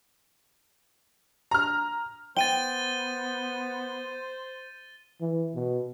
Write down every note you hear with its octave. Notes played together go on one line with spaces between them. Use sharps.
A#5 F6
B3 C5 G5 A6 D#7 G7
E3
B2